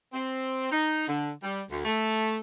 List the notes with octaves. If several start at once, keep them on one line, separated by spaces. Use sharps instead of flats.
C4
D#4
D3
G3
D2
A3